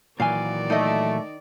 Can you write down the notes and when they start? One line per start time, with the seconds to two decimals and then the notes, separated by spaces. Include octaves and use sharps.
0.20 A#2 D#3 E3 F#3 D5 F5 G#5
0.70 A3 D#4 D#5